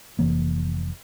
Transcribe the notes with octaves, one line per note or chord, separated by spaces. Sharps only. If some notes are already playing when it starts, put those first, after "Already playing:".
F1 E3 A#3